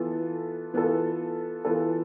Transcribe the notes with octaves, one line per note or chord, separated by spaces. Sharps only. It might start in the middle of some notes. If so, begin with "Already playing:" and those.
Already playing: E3 B3 F4 A4
E3 B3 F4 A4
E3 B3 F4 A4